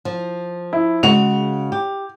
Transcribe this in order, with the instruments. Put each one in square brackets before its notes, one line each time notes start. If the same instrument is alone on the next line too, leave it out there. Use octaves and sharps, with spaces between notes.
[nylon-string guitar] F3
[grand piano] E4
[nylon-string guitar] C#3 G#3 F#4 [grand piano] F7
[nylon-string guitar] G4